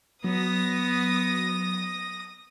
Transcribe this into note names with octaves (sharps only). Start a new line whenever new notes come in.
F#3 B3 D#6 A#6